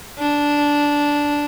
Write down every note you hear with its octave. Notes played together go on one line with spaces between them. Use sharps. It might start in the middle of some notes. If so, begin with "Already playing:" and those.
D4